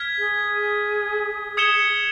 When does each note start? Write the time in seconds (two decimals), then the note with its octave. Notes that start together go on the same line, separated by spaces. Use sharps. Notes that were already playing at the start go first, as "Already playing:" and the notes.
Already playing: F6 G#6 B6
0.19 G#4
1.57 D#6 G#6 C#7 E7 G7